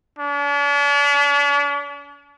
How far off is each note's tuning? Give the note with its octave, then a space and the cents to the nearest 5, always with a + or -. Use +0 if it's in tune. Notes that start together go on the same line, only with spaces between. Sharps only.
D4 -45